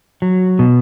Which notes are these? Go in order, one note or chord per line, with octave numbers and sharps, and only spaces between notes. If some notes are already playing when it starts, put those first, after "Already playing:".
F#3
B2